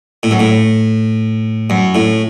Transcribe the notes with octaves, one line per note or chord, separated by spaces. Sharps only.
A2
F#2
A2
F#2
A2